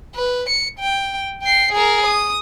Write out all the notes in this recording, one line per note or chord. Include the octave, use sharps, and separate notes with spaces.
B4
C#7
G5
G5 C7
G#4 A#4
D#6